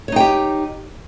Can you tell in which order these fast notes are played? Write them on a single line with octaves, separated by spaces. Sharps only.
C#5 D#4 G5 G4